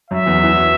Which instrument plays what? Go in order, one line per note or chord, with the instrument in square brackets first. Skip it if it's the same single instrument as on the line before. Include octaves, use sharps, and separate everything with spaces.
[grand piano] F#2 F#3 [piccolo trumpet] E5
[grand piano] E2 E3
E3
F#3